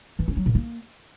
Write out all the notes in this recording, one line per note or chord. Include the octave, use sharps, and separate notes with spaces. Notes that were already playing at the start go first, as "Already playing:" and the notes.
E3
C#4
F#3
A#2
A#3